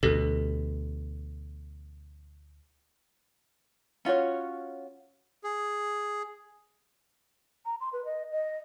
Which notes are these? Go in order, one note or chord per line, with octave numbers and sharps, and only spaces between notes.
D2 B2 G4 A4
C#4 F4 F#4 C#5
G#4
A#5
C6
B4
D#5
D#5